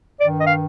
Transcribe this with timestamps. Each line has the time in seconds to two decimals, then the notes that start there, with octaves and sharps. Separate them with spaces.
0.19 G2 D5
0.22 D#3
0.38 D#5
0.46 F5